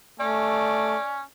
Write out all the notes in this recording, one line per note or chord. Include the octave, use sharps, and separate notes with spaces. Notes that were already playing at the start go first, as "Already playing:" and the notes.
A3 C#4 D5